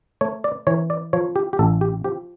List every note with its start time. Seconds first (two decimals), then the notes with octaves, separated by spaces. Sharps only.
0.21 A3 C#5
0.44 D5
0.67 E3 C#5
0.90 D5
1.13 F3 C#5
1.36 G4
1.53 G4
1.59 A1 A4
1.81 G4
2.04 F3 G4